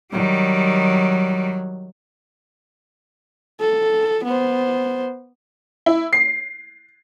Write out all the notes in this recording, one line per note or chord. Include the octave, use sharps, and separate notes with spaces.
D#3 F#3 G3
A4
B3 C5
E4
C7